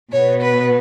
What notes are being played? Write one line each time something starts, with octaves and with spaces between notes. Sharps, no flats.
B2 B3 C#5
B4